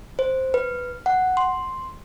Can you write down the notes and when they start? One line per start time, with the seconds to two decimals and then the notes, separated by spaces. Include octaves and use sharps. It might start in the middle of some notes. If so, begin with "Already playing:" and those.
0.19 C5
0.54 B4
1.06 F#5
1.37 C6